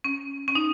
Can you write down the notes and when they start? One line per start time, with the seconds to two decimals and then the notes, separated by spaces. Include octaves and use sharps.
0.04 C#4
0.48 C#4
0.55 D#4